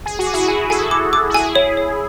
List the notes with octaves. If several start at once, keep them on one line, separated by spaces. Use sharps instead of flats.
G#4 G#5
F#4
D6
E4 G#4
G#5
F#4 A4 G#5
D6
D6
F#4
E4 G#4 G#5
C#5
C#5